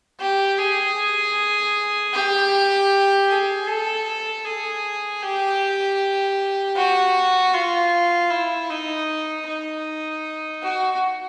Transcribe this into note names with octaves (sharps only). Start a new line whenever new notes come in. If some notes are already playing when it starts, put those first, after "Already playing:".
G4
G#4
G4
G#4
A4
G#4
G4
F#4
F4
E4
D#4
D#4
F#4